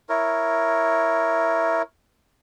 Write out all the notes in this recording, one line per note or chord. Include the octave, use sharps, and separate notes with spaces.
E4 A#4 C#5